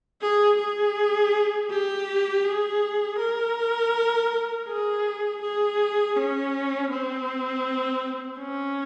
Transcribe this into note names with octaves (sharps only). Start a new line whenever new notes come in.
G#4
G#4
G4
G#4
A#4
G#4
G#4
C#4
C4
C#4